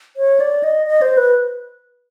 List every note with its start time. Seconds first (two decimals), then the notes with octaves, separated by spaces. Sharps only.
0.17 C#5
0.40 D5
0.64 D#5
0.87 D#5
1.02 C5
1.17 B4